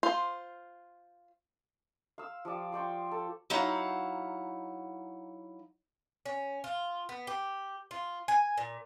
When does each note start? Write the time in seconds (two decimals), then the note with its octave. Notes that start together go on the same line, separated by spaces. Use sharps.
0.03 F4 C5
2.18 F5 E6
2.45 F3 G4 D5
2.72 C5 D5 G5 C#6
3.12 A4
3.50 F#3 D#4 E4 F5 F#5
6.26 C#4
6.64 F4
7.09 B3
7.27 G4
7.91 F4
8.28 G#5
8.58 A#2